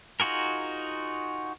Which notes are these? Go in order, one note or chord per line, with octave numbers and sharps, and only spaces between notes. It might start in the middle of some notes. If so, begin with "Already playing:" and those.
D#4 F4 F#4 G#4 A#4